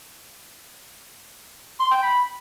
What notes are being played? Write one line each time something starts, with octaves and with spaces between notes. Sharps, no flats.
C6
G5
B5